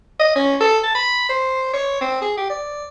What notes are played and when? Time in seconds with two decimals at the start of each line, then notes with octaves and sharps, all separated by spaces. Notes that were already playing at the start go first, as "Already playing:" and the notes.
0.19 D#5
0.36 C#4
0.60 A4
0.83 A5
0.95 B5
1.29 C5
1.73 C#5
2.01 C4
2.22 G#4
2.37 G4
2.50 D5